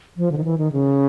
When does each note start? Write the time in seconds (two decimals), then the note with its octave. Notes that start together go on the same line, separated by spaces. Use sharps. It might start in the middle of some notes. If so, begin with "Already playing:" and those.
0.17 F3
0.32 D3
0.38 D#3
0.44 E3
0.58 D#3
0.72 C#3